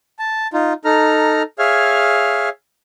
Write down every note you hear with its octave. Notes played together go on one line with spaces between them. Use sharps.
A5
D#4 F4
D#4 A4 A#5 F6
G#4 C#5 E5 F5 F6